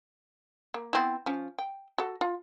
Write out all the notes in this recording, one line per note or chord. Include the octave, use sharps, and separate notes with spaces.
A#3
B3 C4 E4
F3 C#4
G5
F#4 A4
F4